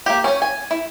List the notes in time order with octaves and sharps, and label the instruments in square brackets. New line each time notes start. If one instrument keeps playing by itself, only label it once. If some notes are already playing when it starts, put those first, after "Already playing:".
[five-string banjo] A#3 G4
C#4 C#5
G#5
E4